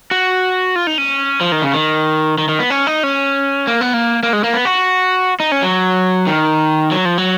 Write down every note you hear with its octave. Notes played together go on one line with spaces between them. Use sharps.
F#4
F4
D#4
C#4
F3
D#3
C#3
D#3
D#3
D#3
B3
C#4
D#4
C#4
A#3
B3
A#3
A#3
G#3
A#3
B3
F#4
D#4
C#4
F#3
D#3
F#3
F3
F#3